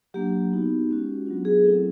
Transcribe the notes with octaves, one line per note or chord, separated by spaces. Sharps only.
F#3 A#3 D4 G4
B3 D#4 F#4
G#3 C#4 F#4
F#3 B3 D4 F4
G#4
F#3 A3 C4 E4 A4